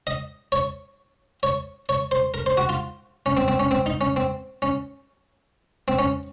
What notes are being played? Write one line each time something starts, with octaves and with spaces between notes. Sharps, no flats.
D#5
C#5
C#5
C#5
C5
A#4
C5
F#4
F4
C#4
C4
C4
C#4
C4
D#4
C#4
C4
C#4
C4
C#4